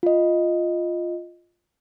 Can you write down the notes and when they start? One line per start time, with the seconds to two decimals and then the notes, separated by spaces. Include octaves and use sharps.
0.03 F4 D#5